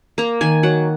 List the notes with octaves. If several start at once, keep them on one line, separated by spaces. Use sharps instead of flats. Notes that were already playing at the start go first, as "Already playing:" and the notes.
A#3 A#5
D#3 G#5
F#3 F#5